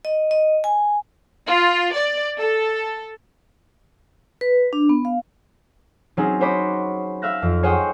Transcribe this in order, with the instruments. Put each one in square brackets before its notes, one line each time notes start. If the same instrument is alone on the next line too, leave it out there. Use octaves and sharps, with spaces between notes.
[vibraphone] D#5
D#5
G#5
[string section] F4
D5
A4
[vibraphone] B4
D4
B3
F5
[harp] F#3 C4 C#4 D#4 G#4
F#4 C5 C#5 D#5 B5 D6
E5 F5 E6 F#6 A#6
F2
G#4 C5 C#5 D#5 F#5 G5